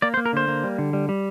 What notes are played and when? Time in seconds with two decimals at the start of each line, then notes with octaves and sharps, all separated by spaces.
0.02 A#3 D5
0.14 C5
0.17 A#3
0.26 A#4
0.33 D3 C5
0.48 A#3
0.64 G3
0.78 D3
0.93 G3
1.09 G3